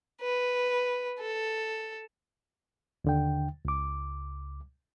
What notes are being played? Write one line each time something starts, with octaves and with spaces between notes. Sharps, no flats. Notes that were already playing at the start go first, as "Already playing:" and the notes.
B4
A4
D#2 D3 G5
C#2 D6